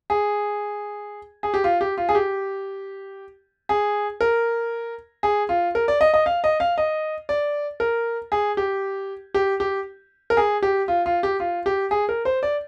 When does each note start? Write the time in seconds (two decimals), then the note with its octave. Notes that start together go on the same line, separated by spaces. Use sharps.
0.10 G#4
1.43 G#4
1.54 G4
1.64 F4
1.81 G4
1.98 F4
2.09 G#4
2.15 G4
3.69 G#4
4.21 A#4
5.23 G#4
5.49 F4
5.75 A#4
5.88 D5
6.01 D#5
6.14 D#5
6.26 F5
6.44 D#5
6.60 F5
6.78 D#5
7.29 D5
7.80 A#4
8.32 G#4
8.57 G4
9.34 G4
9.60 G4
10.30 A#4
10.37 G#4
10.63 G4
10.88 F4
11.06 F4
11.23 G4
11.40 F4
11.66 G4
11.91 G#4
12.09 A#4
12.25 C5
12.43 D5